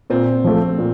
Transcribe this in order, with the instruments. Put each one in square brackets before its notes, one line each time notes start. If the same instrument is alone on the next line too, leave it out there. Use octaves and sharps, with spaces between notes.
[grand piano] A#2 [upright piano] C4
[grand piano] F3 A3
A#2